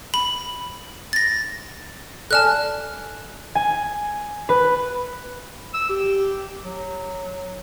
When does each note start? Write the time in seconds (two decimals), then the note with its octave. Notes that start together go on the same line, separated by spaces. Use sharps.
0.14 B5 F#7
1.13 A6 A#6
2.31 A4 D5 G#5 A5 F6 F#6
3.55 G#5
4.49 B4
5.74 E6
5.89 G4
6.64 F#3